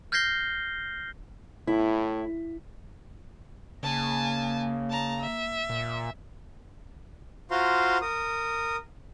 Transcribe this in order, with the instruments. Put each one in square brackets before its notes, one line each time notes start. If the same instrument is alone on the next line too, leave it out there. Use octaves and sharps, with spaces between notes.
[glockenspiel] F6 G6 G#6 A#6 C7 G7
[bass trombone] A2 [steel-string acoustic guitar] E4
[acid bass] C#3 [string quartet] A#3 [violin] G#5 A5
[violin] A5 A#5
E5
[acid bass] A#2
[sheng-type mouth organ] F4 F#4 C5 F5 A#5 C6
A#4 D#6